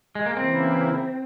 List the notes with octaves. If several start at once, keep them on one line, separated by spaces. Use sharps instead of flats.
G#3
A#3
C#3 E3 A#3 C4 E4